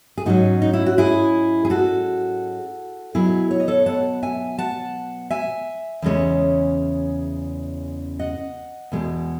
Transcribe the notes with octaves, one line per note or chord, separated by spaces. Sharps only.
G#4
G#2 F#3 C#4 D#4 F#4
D#4
E4
F#4
E4 G#4
G#4
F#4 A4
B2 F#3 B3 E4 G#4
C#5
D#5
A4 C#5
F#5 A5
E5 G#5
F#5 A5
E5 G#5
E2 C#3 G#3 C#4
D#5 F#5
E2 B2 G#3